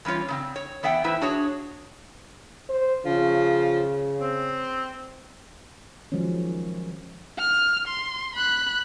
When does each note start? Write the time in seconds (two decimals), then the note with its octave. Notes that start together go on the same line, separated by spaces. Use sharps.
0.05 E3 G3 C#4 F4 C#5
0.28 C#3 A#3 C4
0.56 C#5
0.83 E3 B3 E5 F#5 G5
1.04 A2 E3 E4 B4 C5 E5
1.21 D4 F#4 G#4 C#5
2.70 C5
3.05 C#3 F3
4.20 C4
6.12 D#3 F3 F#3 G#3 C#4
7.38 F6
7.87 C6
8.35 B5 F#6